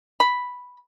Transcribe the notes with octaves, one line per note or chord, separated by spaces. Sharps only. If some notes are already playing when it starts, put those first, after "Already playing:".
B5